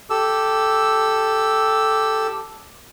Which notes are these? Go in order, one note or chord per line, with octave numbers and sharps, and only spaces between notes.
G4 A4 E6